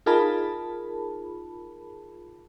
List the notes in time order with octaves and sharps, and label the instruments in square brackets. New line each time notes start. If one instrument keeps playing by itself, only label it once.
[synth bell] D#4 F4 G#4 A#4 A5 B5